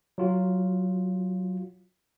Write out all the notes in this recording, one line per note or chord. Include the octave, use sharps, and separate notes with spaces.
F#3 F4 F#4